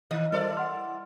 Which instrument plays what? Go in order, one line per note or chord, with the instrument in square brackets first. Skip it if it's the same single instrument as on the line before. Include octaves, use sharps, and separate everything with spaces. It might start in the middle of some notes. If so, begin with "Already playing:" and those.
[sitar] D#3 [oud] D#5
[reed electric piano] G3 A#4 C5 [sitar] E4 A4 D5
[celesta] F#5 C6 [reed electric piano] F6